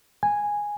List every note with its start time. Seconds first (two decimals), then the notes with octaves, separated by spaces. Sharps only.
0.23 G#5